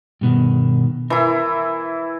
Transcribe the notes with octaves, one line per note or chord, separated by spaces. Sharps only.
G2 B2 D#3
E3 E4 A#4